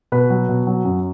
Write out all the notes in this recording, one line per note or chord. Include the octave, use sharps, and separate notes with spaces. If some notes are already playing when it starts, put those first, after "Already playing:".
B2 B4
F#3
B2
F#3
F#2